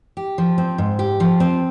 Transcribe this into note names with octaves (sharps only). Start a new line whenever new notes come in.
G4
F3
C4
G#2
G4
F3
C4